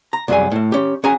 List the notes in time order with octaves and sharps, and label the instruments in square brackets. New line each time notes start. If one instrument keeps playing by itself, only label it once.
[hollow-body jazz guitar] A#5
C2 F#2 F#3 G3 G#4 G#5
A2 A3
C#4 G4
C#4 F#4 G#4 G#5 A#5